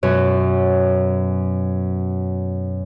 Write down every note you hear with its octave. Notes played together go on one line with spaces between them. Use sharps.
F#2 B2 C#5